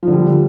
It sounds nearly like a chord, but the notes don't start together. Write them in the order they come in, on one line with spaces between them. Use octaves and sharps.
F3 D3 G3